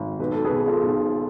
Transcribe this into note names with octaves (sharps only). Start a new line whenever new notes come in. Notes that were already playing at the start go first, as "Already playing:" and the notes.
Already playing: G#1
B1 B4
A4
G#4 B4
B2
F4 A4
B1